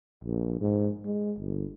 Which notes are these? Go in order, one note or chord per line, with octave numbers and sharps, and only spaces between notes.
A#1
G#2
G#3
G1